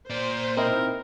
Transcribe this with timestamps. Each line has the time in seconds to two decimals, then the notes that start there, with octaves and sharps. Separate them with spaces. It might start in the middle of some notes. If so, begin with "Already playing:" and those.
0.10 A#2 C5 D5
0.57 C4 D#4 E4 A#4